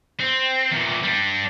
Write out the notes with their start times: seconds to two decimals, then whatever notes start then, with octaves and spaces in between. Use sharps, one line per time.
0.20 C4
0.72 E2 A#2
1.04 G3 D4